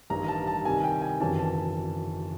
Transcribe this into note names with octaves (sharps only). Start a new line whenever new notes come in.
A1 G2 D#3 A#5
A5
A5
C2 C3 D#3 G#5
G5
G#5
G#1 F#2 C#3 E3 A5
A5